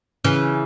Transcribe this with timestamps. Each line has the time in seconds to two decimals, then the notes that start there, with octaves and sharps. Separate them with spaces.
0.24 C#3 E3